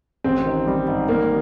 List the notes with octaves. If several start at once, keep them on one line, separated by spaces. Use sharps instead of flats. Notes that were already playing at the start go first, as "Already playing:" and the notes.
A1 C4
D#3
G3
G#2
D#3 A#3